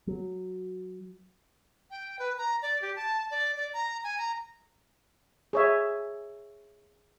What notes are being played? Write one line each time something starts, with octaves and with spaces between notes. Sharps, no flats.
F#3
G5
B4
A#5
D5
G4
A5
D5
D5
A#5
G#5
A#5
G#4 C#5 E5